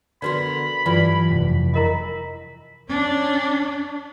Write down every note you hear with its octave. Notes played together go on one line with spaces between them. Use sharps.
D3 B3 F#4 A#4 B4 D5 B5
G2 E3 F#3 F4 B4 D5
F1
E4 A#4 D#5 B5
C#4 D4